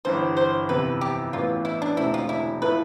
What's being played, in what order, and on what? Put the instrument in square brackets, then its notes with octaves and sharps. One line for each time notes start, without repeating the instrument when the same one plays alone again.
[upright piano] G1 G2 E3 [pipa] C5
[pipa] C5
[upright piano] F2 C3 E3 B3 [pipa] B4
[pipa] G4
[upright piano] A1 A2 E3 B3 [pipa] F4
[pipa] E4
D4
[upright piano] E1 E2 D3 A3 C4 [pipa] E4
[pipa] F4
E4
[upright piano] A2 F3 A3 E4 [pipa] B4